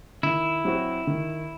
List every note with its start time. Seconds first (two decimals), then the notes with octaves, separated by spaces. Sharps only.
0.23 D#3 E4
0.65 F#3 C4 F#4
1.07 D#3